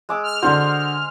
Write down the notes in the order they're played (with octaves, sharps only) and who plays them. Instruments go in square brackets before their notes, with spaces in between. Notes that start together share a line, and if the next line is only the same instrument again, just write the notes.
[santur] G#3 D6 E6
[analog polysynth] F6
[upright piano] D3 D4 F#4 [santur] C5 C6